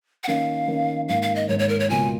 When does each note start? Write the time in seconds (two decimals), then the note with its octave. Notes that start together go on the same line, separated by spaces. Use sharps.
0.24 F#5
0.28 D#3 A#3 C#4 F5
0.68 D#3 A#3 C#4
1.09 G#2 D#3 A#3 F5
1.22 F5
1.35 D#5
1.49 G#2 C#5
1.51 D#3 A#3
1.59 C#5
1.69 A#4
1.80 C#5
1.89 C#2 B2 A#3 F4 G#5